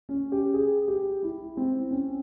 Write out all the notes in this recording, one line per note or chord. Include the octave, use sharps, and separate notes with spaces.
C#4
G4
G#4
G4
E4
C4
C#4